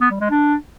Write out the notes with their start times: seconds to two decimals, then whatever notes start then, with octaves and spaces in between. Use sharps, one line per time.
0.01 B3
0.11 G3
0.20 G#3
0.30 D4